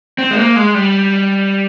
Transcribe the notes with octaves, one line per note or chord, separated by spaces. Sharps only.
C4
G#3
A#3
G#3
G3